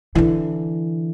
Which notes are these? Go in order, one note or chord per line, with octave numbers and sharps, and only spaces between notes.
D3 E3